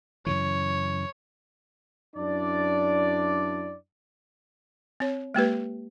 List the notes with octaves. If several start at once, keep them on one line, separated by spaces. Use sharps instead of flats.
F#2 C#3 E3 C#5
F#2 D4 E4 D5
C4 C#5
G#3 A#3 G4 B4